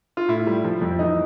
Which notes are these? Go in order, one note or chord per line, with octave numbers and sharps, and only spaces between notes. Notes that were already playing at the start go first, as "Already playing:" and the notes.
F4
A2 E4
G3
F3
F2
E3 D#4